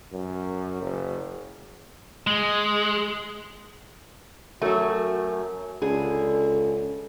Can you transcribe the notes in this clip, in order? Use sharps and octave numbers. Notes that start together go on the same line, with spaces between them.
F#2
F#1
G#3
F#2 F#3 A3 F#4
C#2 D3 G#4 A4